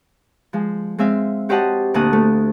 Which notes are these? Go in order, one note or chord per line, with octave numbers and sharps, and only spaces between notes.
F3 G#3
G#3 C4 E5 F5
F#4 G4 C5 D#5 F#5 A5
D2 A#2 A5 D#6 F#6
A3